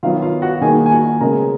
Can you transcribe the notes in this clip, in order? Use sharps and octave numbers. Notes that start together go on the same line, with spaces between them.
D#3 F#3 B3 F4 F5
F4 F5
F#4 F#5
D#3 A#3 G#4 G#5
G#5
F#4 F#5
C#3 G#3 B3 A#4 A#5